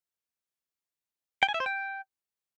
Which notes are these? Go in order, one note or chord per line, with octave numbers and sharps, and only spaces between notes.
G5
G#5
E5
C5
G5